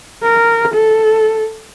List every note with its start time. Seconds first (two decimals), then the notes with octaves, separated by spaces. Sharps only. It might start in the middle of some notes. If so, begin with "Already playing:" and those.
0.23 A#4
0.75 A4